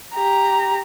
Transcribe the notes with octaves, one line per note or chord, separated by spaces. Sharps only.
G4 A#5